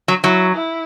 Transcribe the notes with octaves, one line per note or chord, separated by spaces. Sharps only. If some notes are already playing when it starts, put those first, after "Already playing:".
F#3
F#3 E4
E4